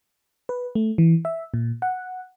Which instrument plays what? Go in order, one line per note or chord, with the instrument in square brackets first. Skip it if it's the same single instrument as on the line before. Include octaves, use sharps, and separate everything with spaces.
[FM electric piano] B4
A3
E3
E5
A#2
F#5